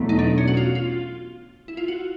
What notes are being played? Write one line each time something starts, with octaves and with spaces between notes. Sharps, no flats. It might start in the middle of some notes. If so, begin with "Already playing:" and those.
Already playing: E2 B2 F#3 A3
D#4
D4
C#4
F#4
F4
F4
E4
F4
F#4